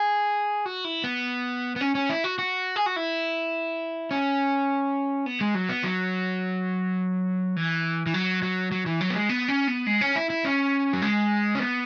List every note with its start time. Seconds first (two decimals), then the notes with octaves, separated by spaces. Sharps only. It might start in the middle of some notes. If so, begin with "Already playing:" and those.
Already playing: G#4
0.66 F#4
0.85 E4
1.04 B3
1.76 B3
1.81 C#4
1.95 C#4
2.09 E4
2.24 F#4
2.39 F#4
2.76 G#4
2.86 F#4
2.96 E4
4.11 C#4
5.26 B3
5.41 G#3
5.55 F#3
5.69 B3
5.84 F#3
7.56 E3
8.06 E3
8.14 F#3
8.43 F#3
8.72 F#3
8.86 E3
9.01 F#3
9.10 B3
9.14 G#3
9.29 B3
9.48 C#4
9.68 B3
9.87 G#3
10.01 C#4
10.16 E4
10.30 E4
10.45 C#4
10.93 F#3
11.02 G#3
11.55 C#4
11.59 B3